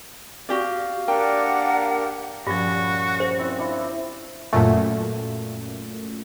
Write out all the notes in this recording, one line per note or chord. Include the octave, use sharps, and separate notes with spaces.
F#4 G4 D5 F5
A#3 D4 G4 A#4 D5 F#5 G5
G2 A#2 F3 G3 C#4 F#4
C5
C4 E4
D4 E4 F4
F#2 A#2 A3